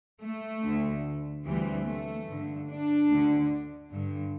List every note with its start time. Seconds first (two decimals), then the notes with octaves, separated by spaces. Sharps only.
0.22 A3
0.62 D2 D3
1.45 D2 C3 E3 G3
1.85 A3
2.27 G2 D3
2.69 D4
3.09 D2 D3
3.91 G2 D3